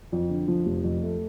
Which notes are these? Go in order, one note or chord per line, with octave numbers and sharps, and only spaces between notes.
F2
D3
F3
F1
F2
A3